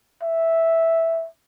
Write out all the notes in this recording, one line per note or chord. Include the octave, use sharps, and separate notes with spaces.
E5